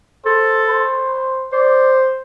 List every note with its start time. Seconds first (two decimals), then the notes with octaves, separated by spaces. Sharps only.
0.25 A4 C5
0.69 C5
1.53 C5 D5